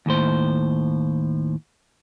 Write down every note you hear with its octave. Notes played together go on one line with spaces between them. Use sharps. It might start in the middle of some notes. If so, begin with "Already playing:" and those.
D#2 A2 C5